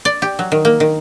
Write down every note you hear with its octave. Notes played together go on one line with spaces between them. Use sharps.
D5
G4
F#3
D#3
A#3
D#3